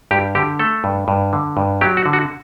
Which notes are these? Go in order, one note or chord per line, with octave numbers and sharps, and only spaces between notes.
G2 G4
D3 G4
A3 A4
G2
G2
D3
G2
F#3 G4
F#4
D3
F#4